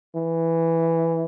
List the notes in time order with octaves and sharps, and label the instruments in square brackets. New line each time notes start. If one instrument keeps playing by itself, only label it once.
[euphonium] E3